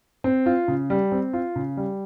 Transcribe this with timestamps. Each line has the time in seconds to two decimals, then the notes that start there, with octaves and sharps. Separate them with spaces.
0.24 C4
0.46 F4
0.68 C#3
0.90 G3
1.12 C4
1.33 F4
1.56 C#3
1.77 G3